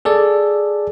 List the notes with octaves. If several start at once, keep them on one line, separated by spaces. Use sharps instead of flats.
G#4 A4 D5